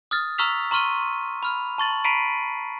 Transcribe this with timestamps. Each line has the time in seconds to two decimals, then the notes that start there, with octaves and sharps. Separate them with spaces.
0.11 D#6 F6 A6
0.38 A#5 C#6 E6 F6 B6 F7
0.71 A#5 C6 C#6 F6 D#7 G7
1.43 B5 F6 F7
1.78 A5 C#6 A6 F#7
2.04 A#5 B5 B6 C7 D7 D#7